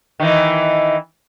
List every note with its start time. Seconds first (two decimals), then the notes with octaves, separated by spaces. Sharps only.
0.20 D#3 E3